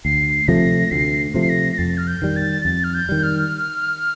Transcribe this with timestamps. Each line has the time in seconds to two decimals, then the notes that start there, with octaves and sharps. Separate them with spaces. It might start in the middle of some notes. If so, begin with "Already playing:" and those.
0.05 D2 C7
0.48 C3 F3 A3 A#6
0.91 D2 C7
1.34 C3 F3 A3
1.42 C7
1.49 A#6
1.72 A#6
1.78 F2 A6
1.98 F6
2.07 G6
2.22 D#3 G3
2.36 A6
2.65 F2 A6
2.84 F6
2.94 G6
3.09 D#3 G3
3.23 F6